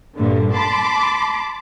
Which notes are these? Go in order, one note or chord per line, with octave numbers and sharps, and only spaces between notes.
G2 A#2 D3
A5 B5 C6 D6